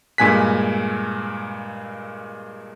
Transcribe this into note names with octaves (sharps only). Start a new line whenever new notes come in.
G2 A#2 G#3 G#5 F#6 B6